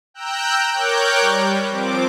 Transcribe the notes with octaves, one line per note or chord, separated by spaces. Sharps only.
G5 A#5 E6 F#6 G6
A#4 C#5 G5 D6 F#6 G6
G3
F3 C4 D6